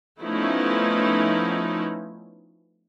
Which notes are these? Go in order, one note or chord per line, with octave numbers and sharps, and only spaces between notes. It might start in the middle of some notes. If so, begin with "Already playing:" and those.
F3 A3 B3 C#4 D#4 E4